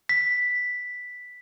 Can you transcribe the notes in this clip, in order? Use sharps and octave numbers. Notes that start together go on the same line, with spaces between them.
B6